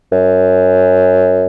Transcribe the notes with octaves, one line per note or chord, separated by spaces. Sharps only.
F#2